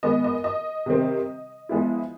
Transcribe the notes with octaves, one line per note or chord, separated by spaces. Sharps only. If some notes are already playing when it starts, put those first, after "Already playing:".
D#3 G#3 B3 D#5
D#5
D#5
C3 D#3 G3 C4
F3 G#3 B3 E4